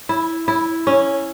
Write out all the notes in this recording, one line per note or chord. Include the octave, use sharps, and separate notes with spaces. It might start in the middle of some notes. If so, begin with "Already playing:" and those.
E4
E4
C#4